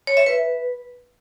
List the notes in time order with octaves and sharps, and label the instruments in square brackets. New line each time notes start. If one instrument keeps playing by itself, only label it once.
[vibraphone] C#5
E5
B4